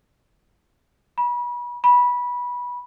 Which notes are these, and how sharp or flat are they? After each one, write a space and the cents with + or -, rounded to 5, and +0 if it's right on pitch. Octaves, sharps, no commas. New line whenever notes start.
B5 -35
B5 -20